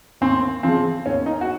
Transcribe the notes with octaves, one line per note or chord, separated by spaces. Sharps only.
D#2 C4
C#3 F3 C4
D#2 C#4
D#4
F#4